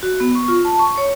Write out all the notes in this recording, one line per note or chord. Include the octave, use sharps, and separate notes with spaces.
F#4
B3
C#6
F4
A5
C#6
C#5